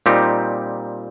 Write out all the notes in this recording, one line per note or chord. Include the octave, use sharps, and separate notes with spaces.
A#2 G3 C4 D#4 G4